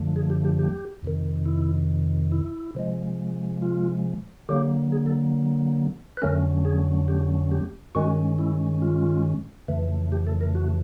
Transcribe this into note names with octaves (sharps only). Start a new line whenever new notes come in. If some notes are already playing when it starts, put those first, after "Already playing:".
Already playing: F#2 D3 F3 A3
G#4
G4
G4
G4
F2 C3 D#3
E4
E4
C3 F3 G#3
F4
D3 F#3 A#3 G4
G#4
A4
B4
F2 D3 F#3 A3 C#4 A#4
G#4
G4
G4
G2 D#3 G#3 C#4 F#4
E4
F4
F2 C#3 E3 A3
G4
A4
A#4
F#4